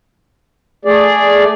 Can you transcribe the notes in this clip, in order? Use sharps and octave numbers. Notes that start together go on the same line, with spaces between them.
A3 G#4 D5